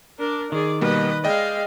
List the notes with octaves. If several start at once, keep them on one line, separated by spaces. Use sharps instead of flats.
D4 A#4
D#3 G#4 D5
B2 G3 A#3 B4 D#5
G#3 D5 D#5 F5 G5